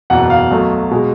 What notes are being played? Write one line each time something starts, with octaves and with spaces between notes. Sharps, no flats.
F#1 E2 B2 F#5
F5
B1 B2 F#3 A3
B2 G#3